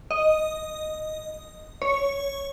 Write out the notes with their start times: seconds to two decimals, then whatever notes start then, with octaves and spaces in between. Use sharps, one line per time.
0.11 D#5
1.82 C#5